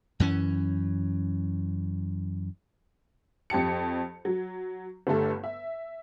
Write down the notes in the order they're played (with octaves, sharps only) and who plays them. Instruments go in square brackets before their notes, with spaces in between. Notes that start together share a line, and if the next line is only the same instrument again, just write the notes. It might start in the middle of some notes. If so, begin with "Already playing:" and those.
[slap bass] F#2 E3 C#4
[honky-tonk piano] F2 G4 A5 C#7
F#3
G1 G2 A3 A4
E5